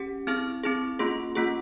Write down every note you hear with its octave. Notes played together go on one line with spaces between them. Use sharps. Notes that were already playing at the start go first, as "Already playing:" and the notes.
Already playing: C#4 G4
C4 E4 G#4 F6
C4 E4 G#4
A#3 C#4 F4 G#4 C6
A#3 C#4 F4 G#4